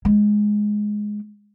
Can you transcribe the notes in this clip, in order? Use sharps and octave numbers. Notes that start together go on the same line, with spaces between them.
G#3